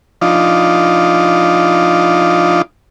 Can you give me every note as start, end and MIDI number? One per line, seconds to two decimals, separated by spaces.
0.22 2.62 53
0.22 2.62 62
0.22 2.62 63
0.22 2.62 65